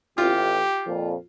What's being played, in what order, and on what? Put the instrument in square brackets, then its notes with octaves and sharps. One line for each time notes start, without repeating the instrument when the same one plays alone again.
[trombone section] A1 [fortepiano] F4 [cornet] G4
[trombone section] F2 A#2